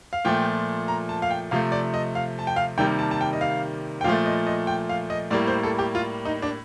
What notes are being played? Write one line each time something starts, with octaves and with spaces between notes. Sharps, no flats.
F5
A#2 F3 A3 G5
A#5
A5
F5
G5
C3 F3 A3 F5
D5
D#5
F5
A5
G5
F5
C3 D#3 G3 A#3 G5
A5
A5
G5
D#5
F5
G5
A#2 F3 A3 F5
D#5
D#5
G5
F5
D#5
A2 G3 A#3 D5
C5
A4
G4
F4
D#4
D4